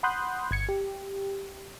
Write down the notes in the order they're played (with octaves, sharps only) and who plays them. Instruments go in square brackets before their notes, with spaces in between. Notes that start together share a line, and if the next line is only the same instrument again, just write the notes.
[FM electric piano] F#5 B5 C6 D#6 F#6 G6
G1 G#6 C#7
G4